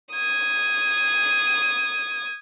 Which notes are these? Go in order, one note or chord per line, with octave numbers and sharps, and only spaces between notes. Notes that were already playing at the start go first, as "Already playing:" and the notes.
D#6 G#6